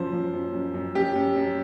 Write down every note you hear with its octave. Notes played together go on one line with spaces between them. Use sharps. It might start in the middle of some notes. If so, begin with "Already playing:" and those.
Already playing: F#2 F3 C5
F3
F#2
F#2
F#2
F#2 G4
F#2
F#2